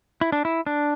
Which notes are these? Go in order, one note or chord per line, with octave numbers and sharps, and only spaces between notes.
E4
D4
E4
D4